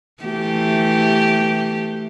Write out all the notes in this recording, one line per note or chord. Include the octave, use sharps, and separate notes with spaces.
E3 A3 G4